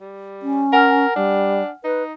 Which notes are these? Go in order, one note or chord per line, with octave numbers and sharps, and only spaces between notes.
G3
C#4
A#4 F#5 G#5 F6
G3 D4
D#4 B4